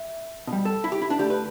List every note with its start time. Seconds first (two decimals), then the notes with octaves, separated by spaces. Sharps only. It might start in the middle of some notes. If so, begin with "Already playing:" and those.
Already playing: E5
0.47 B2
0.52 G3
0.65 A4
0.84 E4
0.92 G4
1.02 E4
1.10 D4
1.18 D3 A3 G4
1.30 B4